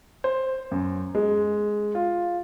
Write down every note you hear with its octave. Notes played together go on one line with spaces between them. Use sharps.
C5
F#2
G#3
F4